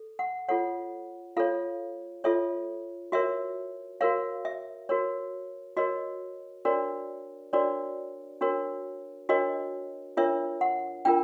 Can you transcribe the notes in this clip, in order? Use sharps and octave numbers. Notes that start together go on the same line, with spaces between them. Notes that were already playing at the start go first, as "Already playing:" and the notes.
Already playing: A4
F#5
F4 A4 C#5 F#5
F4 A4 C#5 F5
F4 A4 C#5 E5
F#4 A#4 C#5 E5
F#4 A#4 C#5 F5
E5
F#4 A#4 C#5
F#4 A#4 C#5 D#5
D4 F#4 A#4 C#5 D5
D4 F#4 A#4 C#5 D5
D4 F#4 A#4 C#5
D4 F#4 A#4 C#5 D#5
D4 F4 A#4 C#5 E5
F#5
D4 F4 A#4 G5